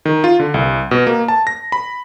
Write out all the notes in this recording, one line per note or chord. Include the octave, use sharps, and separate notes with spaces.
D#3
F4
D3
C2
B2
A#3
A5
A#6
B5